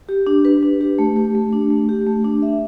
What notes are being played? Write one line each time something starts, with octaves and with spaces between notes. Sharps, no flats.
G4
D4
B4
D4
G4
A3
G4
A3
D4
A3
G4
A3
D4
E5